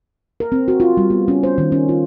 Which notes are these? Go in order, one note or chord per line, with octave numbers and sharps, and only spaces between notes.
A#4
C4
F#4
F4
G3
B3
C#4
C5
D#3
C#4
F4